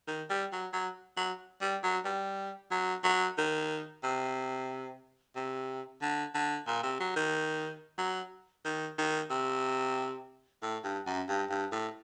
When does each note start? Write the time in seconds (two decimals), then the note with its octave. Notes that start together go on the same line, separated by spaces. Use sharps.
0.07 D#3
0.30 G3
0.52 F#3
0.73 F#3
1.17 F#3
1.61 G3
1.83 F#3
2.05 G3
2.71 F#3
3.04 F#3
3.38 D#3
4.04 C3
5.36 C3
6.01 D3
6.34 D3
6.67 A#2
6.83 C3
7.00 F#3
7.16 D#3
7.98 F#3
8.65 D#3
8.98 D#3
9.30 C3
10.62 A2
10.84 G2
11.07 F#2
11.28 G2
11.50 G2
11.72 A2